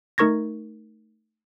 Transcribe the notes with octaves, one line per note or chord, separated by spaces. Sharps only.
A3 D#4 A#4 C#6 G#6 A#6